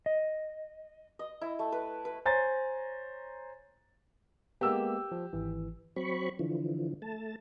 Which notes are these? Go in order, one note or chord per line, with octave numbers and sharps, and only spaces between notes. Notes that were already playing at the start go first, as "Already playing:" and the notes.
D#5
D#5
E4
A3
B4
B4
C5 C#5 G#5 A#5 A6
G#3 A#3 B3 G4 E6
F3
G#1 E3
F#3 C4 B5 C#6
D3 E3 F3
A3 A5